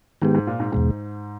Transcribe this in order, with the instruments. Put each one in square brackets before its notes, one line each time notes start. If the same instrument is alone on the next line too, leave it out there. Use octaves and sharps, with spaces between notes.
[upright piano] G#2 [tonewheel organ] D#3 G#3 B3 G4
[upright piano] G#2
A#2
G#2
[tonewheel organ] E2 B2 G#3 [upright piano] G#2